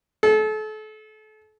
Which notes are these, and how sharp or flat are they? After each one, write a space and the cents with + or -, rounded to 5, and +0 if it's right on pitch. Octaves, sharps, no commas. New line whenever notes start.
A4 -35